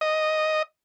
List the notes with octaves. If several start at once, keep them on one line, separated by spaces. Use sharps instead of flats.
D#5